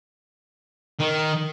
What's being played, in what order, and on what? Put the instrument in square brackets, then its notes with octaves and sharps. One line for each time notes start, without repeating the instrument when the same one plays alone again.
[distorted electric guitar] D#3